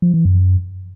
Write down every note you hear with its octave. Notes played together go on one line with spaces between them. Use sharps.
F3
E3
F#2